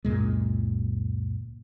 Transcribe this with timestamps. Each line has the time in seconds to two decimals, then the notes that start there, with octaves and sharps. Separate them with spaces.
0.05 C#2 F#2 A#2 G#3